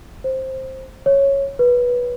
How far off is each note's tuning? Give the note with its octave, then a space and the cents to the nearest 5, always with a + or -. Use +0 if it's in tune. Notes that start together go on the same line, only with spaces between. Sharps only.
C5 +10
C#5 -5
B4 -15